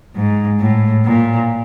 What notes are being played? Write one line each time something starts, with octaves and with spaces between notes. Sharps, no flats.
G#2
A2
A#2